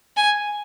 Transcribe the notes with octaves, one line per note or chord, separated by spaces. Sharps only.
G#5